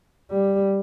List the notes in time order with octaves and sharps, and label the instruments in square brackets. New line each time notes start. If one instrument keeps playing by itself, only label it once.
[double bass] G3